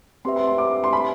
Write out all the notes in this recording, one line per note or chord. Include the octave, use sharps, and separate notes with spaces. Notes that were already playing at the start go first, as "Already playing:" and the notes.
C4 G4 B4 E5 C6
C6
C6
D6
C6
B5